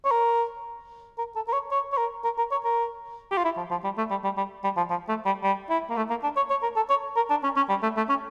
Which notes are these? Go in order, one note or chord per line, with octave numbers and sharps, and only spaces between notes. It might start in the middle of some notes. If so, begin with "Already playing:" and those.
C#5
A#4
A#4
A4
A#4
C#5
C#5
C#5
A#4
A#4
A#4
C#5
A#4
G4
F4
E4
F3
F3
G3
A3
G3
G3
G3
G3
F3
F3
A3
G3
G3
E4
A#3
A3
A#3
D4
C#5
C#5
A#4
A4
C#5
A#4
D4
C#4
C#4
G3
A3
A3
C#4